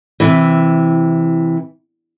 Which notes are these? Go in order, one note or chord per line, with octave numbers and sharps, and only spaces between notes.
C3 E3